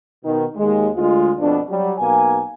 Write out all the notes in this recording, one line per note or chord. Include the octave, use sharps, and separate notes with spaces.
B2 D#3
D#2 G#3
D2 G#3 F4
F2 B2 D4
F#3 G3
B1 B2 A#3 G#5